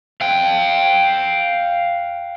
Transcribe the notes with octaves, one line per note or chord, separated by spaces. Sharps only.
F5 G5